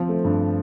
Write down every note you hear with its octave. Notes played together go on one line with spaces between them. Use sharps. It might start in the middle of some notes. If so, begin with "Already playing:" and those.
Already playing: F3 C4
A3
G2